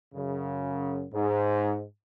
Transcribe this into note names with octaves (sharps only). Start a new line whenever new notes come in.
F#2 C#3
G#2